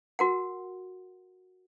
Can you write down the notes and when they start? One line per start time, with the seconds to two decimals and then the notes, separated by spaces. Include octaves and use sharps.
0.19 F#4 A#4 F#5